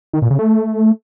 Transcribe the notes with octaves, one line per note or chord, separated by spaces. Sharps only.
D#3
A#2
C#3
A3